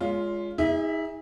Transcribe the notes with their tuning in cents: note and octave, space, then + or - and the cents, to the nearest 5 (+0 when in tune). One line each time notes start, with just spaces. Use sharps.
G#3 +0 C#4 +30 F4 +0
D#4 +45 G#4 -30 E5 +0